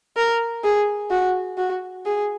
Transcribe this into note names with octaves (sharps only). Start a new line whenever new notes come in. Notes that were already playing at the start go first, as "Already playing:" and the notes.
A#4
G#4
F#4
F#4
G#4